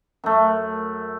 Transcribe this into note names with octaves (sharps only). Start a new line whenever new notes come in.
F#2 A3